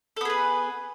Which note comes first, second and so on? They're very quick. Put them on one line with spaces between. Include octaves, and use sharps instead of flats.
A4 B3 G#4 B4